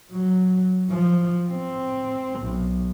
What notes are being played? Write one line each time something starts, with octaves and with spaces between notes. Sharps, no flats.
F#3
F3
C4
B1